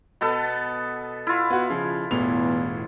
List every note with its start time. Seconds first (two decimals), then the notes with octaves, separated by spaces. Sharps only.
0.21 B2 B3 A4
1.27 E4 F4
1.50 B3 F#4
1.70 C#3 F3
2.11 E1 E2 A2 F7